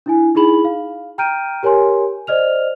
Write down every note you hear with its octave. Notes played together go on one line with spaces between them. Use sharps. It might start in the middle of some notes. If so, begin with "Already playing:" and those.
D4 E4 G#5
D#4 E4 G#4 B5 F#7
F5
G5 A#5 F6 G6 D7 D#7
G4 A#4 C#5 G#5 C6
C5 D5 D#5 F6 F7